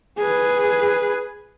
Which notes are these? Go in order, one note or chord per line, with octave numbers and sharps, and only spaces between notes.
G#4 B4